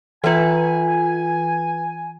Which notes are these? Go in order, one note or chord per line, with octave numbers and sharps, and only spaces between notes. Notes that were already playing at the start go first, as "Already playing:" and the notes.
E3 F4 B4 E5 G#5